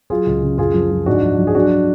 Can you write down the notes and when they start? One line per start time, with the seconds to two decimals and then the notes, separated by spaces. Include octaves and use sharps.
0.10 F#3 F4 G#4
0.26 C#2
0.43 C#3
0.58 F#2 F4 G#4
0.74 F3
0.91 F3
1.06 G#2 D4 F#4
1.22 F3
1.39 F3
1.47 G#4
1.55 F#3 D4 F#4